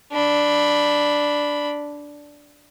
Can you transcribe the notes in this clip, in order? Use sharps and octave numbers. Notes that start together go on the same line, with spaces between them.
D4 B5